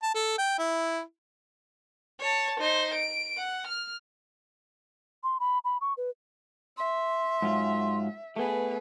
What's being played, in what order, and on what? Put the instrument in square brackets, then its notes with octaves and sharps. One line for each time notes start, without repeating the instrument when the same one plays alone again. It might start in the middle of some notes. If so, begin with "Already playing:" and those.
[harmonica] A5
A4
G5
E4
[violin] C#5 A5
D#4 C5
D7
F#5
F6
[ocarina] C6
B5
B5
C#6
B4
[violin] E5 [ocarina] C6
[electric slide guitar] G#2 F#3 F4
[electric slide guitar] A3 B3 [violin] G#4 B4